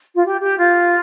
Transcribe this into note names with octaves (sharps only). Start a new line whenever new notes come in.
F4
G4
G4
F4